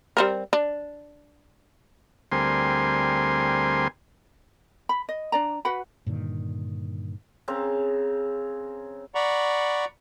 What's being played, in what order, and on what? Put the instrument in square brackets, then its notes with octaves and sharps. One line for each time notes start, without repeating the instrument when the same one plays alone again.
[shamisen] G3 C4 A#4
D4
[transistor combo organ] D2 G3 C4 A#4 G#5 C6
[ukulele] B5
D#5
D4 D5 A#5
F#4 B4 F#5 B5
[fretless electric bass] G2 A#2 D3 D#3
[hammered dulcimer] C#3 C4 A#4
[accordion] D5 F#5 A#5 B5 C#6